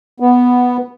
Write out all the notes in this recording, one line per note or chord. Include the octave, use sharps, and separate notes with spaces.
B3